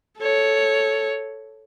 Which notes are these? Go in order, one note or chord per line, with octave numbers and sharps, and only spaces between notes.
A4 C#5